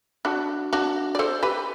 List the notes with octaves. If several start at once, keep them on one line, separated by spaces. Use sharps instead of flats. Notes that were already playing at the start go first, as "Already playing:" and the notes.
D4 F#4
D4 F#4
D5
A4 C5
G4 B4